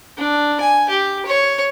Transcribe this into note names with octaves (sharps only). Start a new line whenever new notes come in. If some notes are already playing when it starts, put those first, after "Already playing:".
D4
G#5
G4
C#5